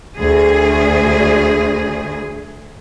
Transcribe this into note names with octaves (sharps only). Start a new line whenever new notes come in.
D2 G#4